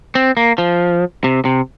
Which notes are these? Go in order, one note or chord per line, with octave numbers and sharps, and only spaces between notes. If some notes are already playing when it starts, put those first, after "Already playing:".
C4
A#3
F3
C3
C3